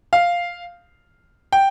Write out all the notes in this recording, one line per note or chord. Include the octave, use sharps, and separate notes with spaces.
F5
G5